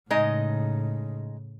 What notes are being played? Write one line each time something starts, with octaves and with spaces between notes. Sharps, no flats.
A2 C#3 G#3 D#4 D#5